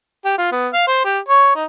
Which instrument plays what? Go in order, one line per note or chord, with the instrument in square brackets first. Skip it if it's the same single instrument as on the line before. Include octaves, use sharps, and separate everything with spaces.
[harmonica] G4
F4
B3
F5
C5
G4
C#5
D#4